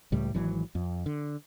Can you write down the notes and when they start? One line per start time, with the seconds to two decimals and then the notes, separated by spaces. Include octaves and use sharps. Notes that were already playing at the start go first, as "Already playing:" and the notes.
0.12 C#2 A2 G3
0.34 G#1 E3 F#3
0.75 F2
1.06 D3